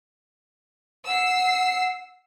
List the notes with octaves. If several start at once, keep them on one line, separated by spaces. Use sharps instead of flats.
F#5 E6 C7